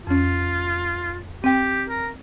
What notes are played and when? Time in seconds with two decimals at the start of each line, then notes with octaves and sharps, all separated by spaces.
0.07 F2 C#4 F4
1.44 C4 G4 G5
1.90 A#4